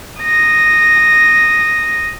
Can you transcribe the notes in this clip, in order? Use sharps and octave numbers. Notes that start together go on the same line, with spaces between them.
D#6 A#6